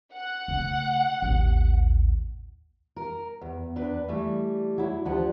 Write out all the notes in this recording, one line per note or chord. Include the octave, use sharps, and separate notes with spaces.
F#5
C#3 A3
A1 D#2
A#4
E2
E2 D4 B4
E3 G3 A3
F#3 E4
D2 F3 D4 G4 F#5